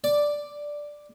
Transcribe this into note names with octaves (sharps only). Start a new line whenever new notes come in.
D5